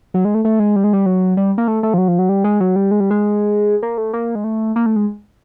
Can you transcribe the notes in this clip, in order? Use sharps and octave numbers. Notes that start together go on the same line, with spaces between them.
F#3
G#3
A3
A3
G#3
G3
G#3
G3
F#3
G3
A#3
A3
A3
F3
F#3
F3
F#3
G3
G#3
F#3
G3
G#3
G3
G#3
A#3
A3
A#3
G#3
A3
A#3
A3
G#3